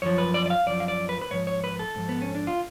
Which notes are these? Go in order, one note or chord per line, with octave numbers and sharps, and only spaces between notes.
F#2 F3 C#5
B4
D5
D5
F5
F#2 F3 D5
F5
D5
B4
B4
G#2 F3 C#5
C#5
B4
A4
G#2 F3
B3
C#4
D4
F4